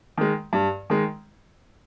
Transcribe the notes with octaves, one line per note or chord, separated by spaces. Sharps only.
D#3 G#3
G2
D#3 G#3